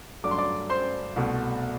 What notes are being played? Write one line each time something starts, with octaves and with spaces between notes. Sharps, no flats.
G2 F#3 A3 D4 D6
C6
D5 D6
C5 C6
C2 B2 A3